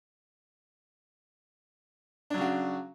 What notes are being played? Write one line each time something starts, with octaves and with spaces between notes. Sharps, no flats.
C#3 F#3 D4 F#4